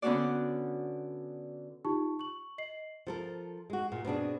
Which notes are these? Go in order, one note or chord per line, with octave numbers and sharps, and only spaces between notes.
D3 B3 C#4 D4 F#4 D5
D#4 F4 G4 A5 C#6
C#6 F#7
D#5 C7 F#7
F3 A4 A#4
G#3 F#4
A#2
B2 C4 D4 G#4